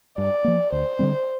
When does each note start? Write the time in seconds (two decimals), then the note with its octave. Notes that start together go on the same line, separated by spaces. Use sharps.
0.18 G2 D5
0.44 F3 A#3
0.72 D2 C5
0.99 D3 G3 C4